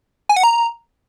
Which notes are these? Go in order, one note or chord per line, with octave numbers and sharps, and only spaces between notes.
G#5
F#5
A#5